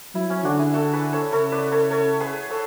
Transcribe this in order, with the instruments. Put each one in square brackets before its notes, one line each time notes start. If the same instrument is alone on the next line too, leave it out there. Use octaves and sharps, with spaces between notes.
[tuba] F#3 [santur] E4
[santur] C#4
[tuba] D3 [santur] D4 F#4
[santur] E4 G#4
F#4 A4
G#4 B4
A4 C#5
[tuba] C#3 [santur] A4 C#5
[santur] B4 D5
A4 C#5
A4 C#5
G#4 B4
A4 C#5